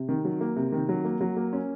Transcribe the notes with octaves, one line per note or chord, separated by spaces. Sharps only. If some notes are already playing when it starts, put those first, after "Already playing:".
Already playing: C3
D#3
F#3
A#3
C3
D#3
F#3
A#3
F#3
A#3
C#4